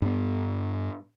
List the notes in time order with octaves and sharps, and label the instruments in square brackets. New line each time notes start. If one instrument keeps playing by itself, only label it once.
[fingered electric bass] G2 B3